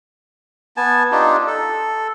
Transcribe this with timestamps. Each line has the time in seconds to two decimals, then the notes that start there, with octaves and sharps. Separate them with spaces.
0.77 B3 G#5 A5
1.12 D4 D#4 F4 G4
1.47 A4